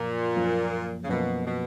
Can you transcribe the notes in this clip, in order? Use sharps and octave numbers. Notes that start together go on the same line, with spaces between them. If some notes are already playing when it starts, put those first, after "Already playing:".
Already playing: F#2 A#2 F3 A#3
F#2 F3 A#3
C#3
F#2 B2 F3 A#3
B2